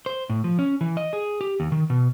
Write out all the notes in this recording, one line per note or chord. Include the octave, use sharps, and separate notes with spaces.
C5
A2
F3
C#4
E3
D#5
G#4
G4
D#2
D#3
B2